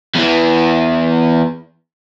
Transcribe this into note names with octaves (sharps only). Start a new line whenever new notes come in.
E2 E3